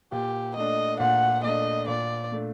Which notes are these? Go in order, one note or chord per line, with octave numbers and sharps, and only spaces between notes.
A#2 G4
A3 D4 D#5
A#2 F#5
A3 D4 D#5
A#2 D5
A3 D4